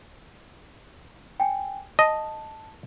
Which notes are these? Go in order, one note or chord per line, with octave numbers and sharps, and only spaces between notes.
G5 G#5
D#5 A5